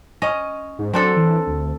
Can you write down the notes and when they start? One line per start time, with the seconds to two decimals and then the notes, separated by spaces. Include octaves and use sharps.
0.22 C#4 D#5
0.79 G#2
0.93 F#3 C4 D4 A4
1.16 E3
1.47 D2